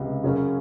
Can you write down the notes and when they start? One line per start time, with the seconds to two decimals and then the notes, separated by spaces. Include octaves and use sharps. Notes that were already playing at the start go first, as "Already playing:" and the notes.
Already playing: C#2 C3
0.24 F#2 C#3 F#3 C#4